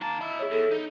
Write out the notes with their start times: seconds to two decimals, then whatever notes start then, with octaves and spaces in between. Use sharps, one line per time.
0.01 D#3 A#3 A5
0.21 E4 D#5 B5
0.39 G#4 C#5
0.51 E2 A4
0.72 D#4